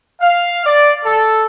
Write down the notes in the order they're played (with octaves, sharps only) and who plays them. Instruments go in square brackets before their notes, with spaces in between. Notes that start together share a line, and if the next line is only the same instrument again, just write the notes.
[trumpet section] F5
D5
A4